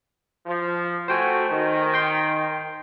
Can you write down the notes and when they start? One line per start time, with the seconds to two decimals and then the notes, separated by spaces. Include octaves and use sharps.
0.46 F3
1.08 A3 F#4 C5 G5 G#5
1.51 D#3
1.94 G5 C6